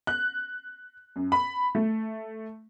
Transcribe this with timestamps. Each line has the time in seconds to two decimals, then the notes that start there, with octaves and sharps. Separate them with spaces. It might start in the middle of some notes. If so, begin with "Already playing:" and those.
0.07 F#6
1.16 F#2
1.32 B5
1.75 A3